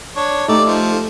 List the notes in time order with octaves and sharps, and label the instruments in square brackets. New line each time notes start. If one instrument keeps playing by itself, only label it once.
[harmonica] D4 C#5
[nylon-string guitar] A3 [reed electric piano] D#4 G4 A4 [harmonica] D5
[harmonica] F3